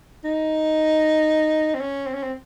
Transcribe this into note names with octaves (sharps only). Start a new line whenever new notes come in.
D#4
C4
C#4
C4
C#4
C4